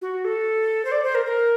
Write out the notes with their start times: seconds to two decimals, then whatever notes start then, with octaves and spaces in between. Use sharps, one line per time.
0.02 F#4
0.25 A4
0.85 C5
0.92 D5
1.04 C5
1.15 A#4
1.25 A#4